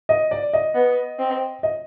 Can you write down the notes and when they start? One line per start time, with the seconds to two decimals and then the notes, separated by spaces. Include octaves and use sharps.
0.09 D#5
0.31 D5
0.53 D#5
0.75 B3
1.19 C4
1.63 D#5